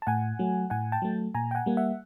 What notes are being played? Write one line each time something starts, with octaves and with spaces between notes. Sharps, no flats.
A5
A2 F#5 G#5
F#3 A3
A2 F#5 G#5
G5 A5
F#3 A3
A#2 G#5 A#5
G5
F#5 G#5
G3 A#3
E5 F#5